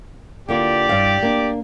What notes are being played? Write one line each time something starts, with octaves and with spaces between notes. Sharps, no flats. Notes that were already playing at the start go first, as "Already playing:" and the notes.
D3 A#3 F4 G4 D5
G2 F5
A#3 D4